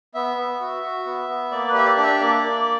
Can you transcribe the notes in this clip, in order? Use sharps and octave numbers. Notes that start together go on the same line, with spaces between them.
B3 E5
B3
F#4
F#4
B3
B3
A#3 D5
B4
G4 E5
D5
D4
E5
A#3 D5
A#3